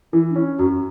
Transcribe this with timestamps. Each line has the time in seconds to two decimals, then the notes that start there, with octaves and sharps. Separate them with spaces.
0.13 E3 E4
0.31 D4
0.36 C#4 E4
0.59 F#2 F#4